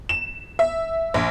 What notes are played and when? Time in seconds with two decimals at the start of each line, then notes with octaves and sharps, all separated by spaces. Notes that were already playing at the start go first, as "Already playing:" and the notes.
0.09 E7
0.59 E5
1.14 A#1